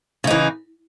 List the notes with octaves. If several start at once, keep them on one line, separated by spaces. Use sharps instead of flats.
C#3 E3 D#4